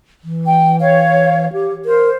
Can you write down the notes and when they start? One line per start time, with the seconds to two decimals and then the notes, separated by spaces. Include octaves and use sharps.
0.24 E3
0.45 G5
0.79 C#5 F5
1.53 G4
1.85 A#4 C5